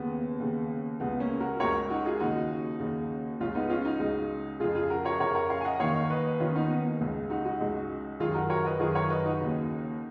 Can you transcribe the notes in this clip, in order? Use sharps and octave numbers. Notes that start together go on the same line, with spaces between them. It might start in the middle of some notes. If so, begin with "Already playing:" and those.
Already playing: D#2 C#3 B3
D#2 C#3
C#2 C#3 B3
A#3 C#4
F#4 A#4
C#2 C#3 A#4 C#5
D#4 F#4
F4 G#4
D#2 C#3 D#4 F#4
D#2 C#3
C#2 C#3 C#4 F4
B3 D#4
C#4 F4
D#4 F#4
C#2 C#3
F2 C#3 F4 G#4
F4 G#4
F#4 A#4
A#4 C#5
F2 C#3 A#4 C#5
A#4 C#5
C#5 F5
G#5
D#5 F#5
D#2 D#3 C#5 F5
B4 D#5
D#2 D#3 C#4 F4
B3 D#4
B3
A#3
C#2 C#3
D#4 F#4
D#4 F#4
C#2 C#3
F#2 D#3 F4 G#4
F#4 A#4
A#4 C#5
B4 D#5
F#2 D#3 F4 G#4
A#4 C#5
B4 D#5
D#4 F#4
D#2 C#3